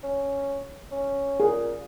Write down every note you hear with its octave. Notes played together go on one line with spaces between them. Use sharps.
C#4
C#4
A#2 G#4